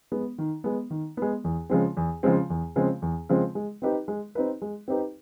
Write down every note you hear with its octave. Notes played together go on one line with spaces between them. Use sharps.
G#3 B3
D#3
G#3 B3
D#3
G#3 B3
E2
C#3 F3 G#3 C4
E2
C#3 F3 G#3 C4
E2
C#3 F3 G#3 C4
E2
C#3 F3 G#3 C4
G#3
C4 D#4 G4 B4
G#3
C4 D#4 G4 B4
G#3
C4 D#4 G4 B4